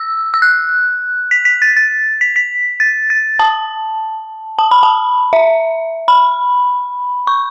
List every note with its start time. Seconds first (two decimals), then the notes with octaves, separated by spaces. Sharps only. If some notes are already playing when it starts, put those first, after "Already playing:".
Already playing: E6
0.34 E6
0.42 F#6
1.31 B6
1.45 B6
1.62 A6
1.77 A6
2.21 B6
2.36 B6
2.80 A6
3.10 A6
3.39 A5
4.59 A5
4.71 B5
4.83 A5
5.33 E5
6.08 B5
7.27 C#6